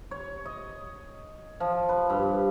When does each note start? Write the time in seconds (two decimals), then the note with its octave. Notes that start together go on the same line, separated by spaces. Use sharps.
0.11 C#5
0.45 D#5
1.60 F3
1.89 B4
2.10 G2